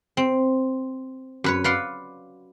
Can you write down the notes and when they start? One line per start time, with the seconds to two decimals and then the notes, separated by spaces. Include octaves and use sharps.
0.17 C4
1.44 F#2 B4 C#5
1.64 B4 D5 F5 F#5 C6